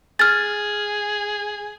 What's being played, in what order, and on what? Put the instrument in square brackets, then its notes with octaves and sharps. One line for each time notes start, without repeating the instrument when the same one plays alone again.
[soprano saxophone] G#4 [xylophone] F6 A6